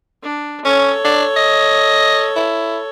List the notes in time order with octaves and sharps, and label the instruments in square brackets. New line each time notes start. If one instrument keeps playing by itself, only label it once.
[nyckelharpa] D4
[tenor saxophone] C#4 [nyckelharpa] A4 C#5
[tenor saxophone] D4
D#5
E4